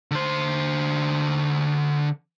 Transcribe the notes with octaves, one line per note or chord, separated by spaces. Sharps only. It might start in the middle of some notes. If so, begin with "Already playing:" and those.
D3 C5